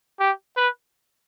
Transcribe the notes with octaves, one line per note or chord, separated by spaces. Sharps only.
G4
B4